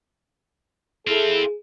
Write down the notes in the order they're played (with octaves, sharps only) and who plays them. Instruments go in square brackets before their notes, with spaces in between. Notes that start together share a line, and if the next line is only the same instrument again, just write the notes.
[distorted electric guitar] C4 F4 [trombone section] E4 A4 [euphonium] G#4